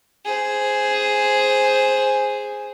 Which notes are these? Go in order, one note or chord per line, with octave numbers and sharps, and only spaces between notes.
G#4 C5